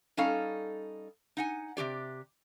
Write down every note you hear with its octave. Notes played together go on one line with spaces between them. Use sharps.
G3 C#4 D#4 A4 F5
D#4 F#5 G#5
C3 F3 G4 D5